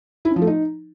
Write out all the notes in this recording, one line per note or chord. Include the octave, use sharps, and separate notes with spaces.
E4
C#4
F3
A3
D#4